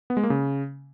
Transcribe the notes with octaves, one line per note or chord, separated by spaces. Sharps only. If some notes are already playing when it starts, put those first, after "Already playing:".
B3
G#3
A#3
C#3